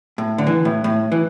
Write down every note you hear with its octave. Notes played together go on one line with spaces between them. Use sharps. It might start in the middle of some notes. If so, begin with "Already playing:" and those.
A2
D3
E3
A2
A2
E3